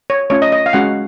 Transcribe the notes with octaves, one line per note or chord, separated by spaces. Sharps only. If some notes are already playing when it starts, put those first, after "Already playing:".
C#5
A3 C#4 F4 C#5
D#5
D#5
F5
G#3 C#4 F#4 F#5